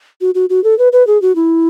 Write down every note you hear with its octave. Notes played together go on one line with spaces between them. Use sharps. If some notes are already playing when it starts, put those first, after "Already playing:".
F#4
F#4
F#4
A4
B4
B4
G#4
F#4
E4